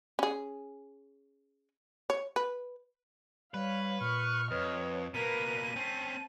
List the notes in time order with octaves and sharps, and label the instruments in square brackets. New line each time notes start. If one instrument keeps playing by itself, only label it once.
[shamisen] C#4 G#4
C#5
B4
[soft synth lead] G3 [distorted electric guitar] B4 [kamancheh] C#5 F5
[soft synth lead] A#2 [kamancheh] C#6 [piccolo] F6
[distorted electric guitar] F2 [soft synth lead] B4 [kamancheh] C#5 D#5
[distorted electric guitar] B2 A#3 [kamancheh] A#4 B4 [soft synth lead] B6 [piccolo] D#7
[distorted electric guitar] C4 C#4 [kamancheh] A5